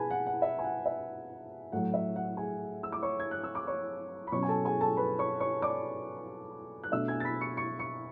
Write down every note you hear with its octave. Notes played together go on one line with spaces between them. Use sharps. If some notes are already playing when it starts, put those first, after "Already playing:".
Already playing: B2 G#4 B4 G#5 A5 B5
F#5
F#5
E5
G#5
F#5
E5
A2 F#3 A3 F#5
E5
F#5
G#4 G#5
E6
D6
C#5 C#6
G#6
F#6
E6
D6
C#5 C#6
B5
B2 F#3 C#4 C#5 C#6
G#5
A4 A5
G#4 G#5
A4 A5
B4 B5
C#5 C#6
C#5 C#6
D5 D6
F#6
B2 A3 D4 E5 E6
G#5 G#6
A6
B5 B6
C#6 C#7
C#6 C#7
C#6 C#7